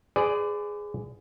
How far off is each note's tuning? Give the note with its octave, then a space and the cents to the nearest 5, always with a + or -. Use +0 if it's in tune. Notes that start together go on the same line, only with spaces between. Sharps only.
G#4 +0 B4 +45 D5 +0